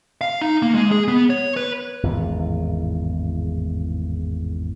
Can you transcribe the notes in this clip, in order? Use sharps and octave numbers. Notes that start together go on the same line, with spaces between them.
F5
D#4
A#3
G#3
G#4
B3
C#5
B4
G#1 E2 A2 C#3